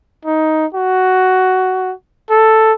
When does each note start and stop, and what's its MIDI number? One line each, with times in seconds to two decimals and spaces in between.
0.25 0.66 63
0.74 1.93 66
2.30 2.73 69